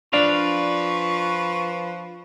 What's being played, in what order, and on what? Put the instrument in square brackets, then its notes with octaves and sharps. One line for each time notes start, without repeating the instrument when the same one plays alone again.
[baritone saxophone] F3 [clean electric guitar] D4 D5 F5 [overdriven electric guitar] B4 [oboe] C#6